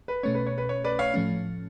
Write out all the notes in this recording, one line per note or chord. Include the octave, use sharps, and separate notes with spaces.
B4
B2 A3 C#4 C#5
B4
C#5
B4
C#5
B4 D5
C#5 F5
A2 F3 A3 C#4